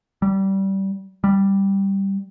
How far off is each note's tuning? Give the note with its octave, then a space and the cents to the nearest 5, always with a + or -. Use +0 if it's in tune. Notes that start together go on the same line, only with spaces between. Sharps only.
G3 -20
G3 +0